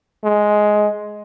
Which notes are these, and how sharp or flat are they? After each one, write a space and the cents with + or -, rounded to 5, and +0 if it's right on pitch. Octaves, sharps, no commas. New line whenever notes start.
G#3 +10